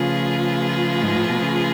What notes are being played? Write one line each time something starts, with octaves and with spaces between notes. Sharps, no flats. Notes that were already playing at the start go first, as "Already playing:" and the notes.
Already playing: C#3 F3 A3 F4 G#4 B4
G#2
A2
B2
C#3